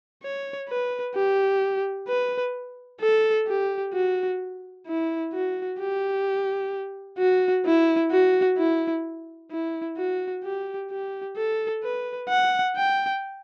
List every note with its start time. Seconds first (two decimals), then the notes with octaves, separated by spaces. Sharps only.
0.23 C#5
0.69 B4
1.15 G4
2.08 B4
3.01 A4
3.47 G4
3.94 F#4
4.87 E4
5.33 F#4
5.79 G4
7.19 F#4
7.66 E4
8.11 F#4
8.58 E4
9.51 E4
9.97 F#4
10.44 G4
10.91 G4
11.37 A4
11.84 B4
12.29 F#5
12.77 G5